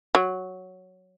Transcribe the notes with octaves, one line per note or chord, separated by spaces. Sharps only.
F#3